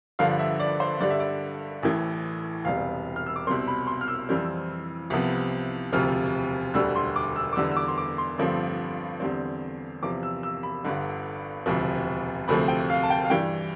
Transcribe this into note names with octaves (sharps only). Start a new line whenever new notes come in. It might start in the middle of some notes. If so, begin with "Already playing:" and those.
G1 G2 D3 F3 F5
E5
D5
C5
G2 D3 G3 D5
E5
D5
A1 A2 E3
E1 E2 C3 G3 F5
F6
E6
D6
C2 B2 G3 C4 C6
B5
C6
F6
E6
F2 E3 G3 C4
C2 C3 F3 B3
E1 D2 C3 F3 F6
E1 D2 D3 G3 E6
C6
D6
E6
D6
E2 D3 G3 B3 E6
E6
D6
C6
D6
C6
G1 G2 F3 A3 C4
E2 D3 G3 C4
E2 C3 F3 D6
E6
E6
B5
G1 G2 D3
E1 D2 C3 F3
D2 C3 F3 A3 C4 B5
G5
F5
A5
G5
F5
G2 E3 G3 G5